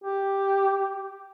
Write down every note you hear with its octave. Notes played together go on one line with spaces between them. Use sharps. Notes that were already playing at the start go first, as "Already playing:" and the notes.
G4